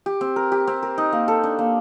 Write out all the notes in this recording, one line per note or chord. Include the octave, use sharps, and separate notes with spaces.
G4
C4
A#4
G4
C4
A#4
D#4
A#3
A4
D4
A#3